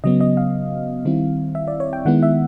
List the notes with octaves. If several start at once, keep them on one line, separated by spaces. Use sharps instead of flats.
C#3 F#3 B3 D#5
D#5
F5
D#3 G3 C4 E4
E5
D5
C#5
G5
D#3 G#3 B3 E4 F#5
E5